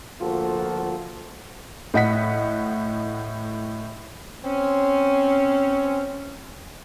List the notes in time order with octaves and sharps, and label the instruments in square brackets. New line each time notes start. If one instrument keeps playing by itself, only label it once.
[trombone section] D2 F3 A#3 F4 F#4 A4
[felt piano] A2 D#5 F#5 B6
[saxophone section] C4 C#4